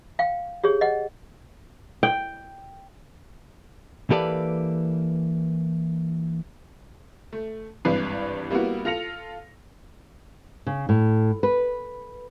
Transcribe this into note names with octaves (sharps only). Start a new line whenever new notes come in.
F5 G5
G4 G#4 C#5
D#5 F#5
G5
E3 A#3 G4 A4 B4 D5
A3
G#1 G2 E3 D4 B4 C7
G3 A#3 B3 E4 F#4
F4 A4 A#6 C#7 F7
C#3
A2
B4